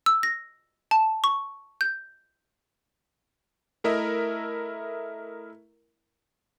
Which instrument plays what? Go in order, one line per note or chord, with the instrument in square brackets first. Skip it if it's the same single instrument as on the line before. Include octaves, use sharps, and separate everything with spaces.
[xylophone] E6
A#6
A5
C#6
G6
[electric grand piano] A3 E4 A#4 D#5 E5